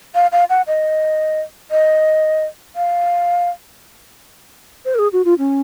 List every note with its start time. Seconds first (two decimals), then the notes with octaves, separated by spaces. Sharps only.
0.15 F5
0.32 F5
0.50 F#5
0.67 D#5
1.71 D#5
2.76 F5
4.85 C5
4.95 A#4
4.99 G#4
5.13 F#4
5.25 F4
5.39 C#4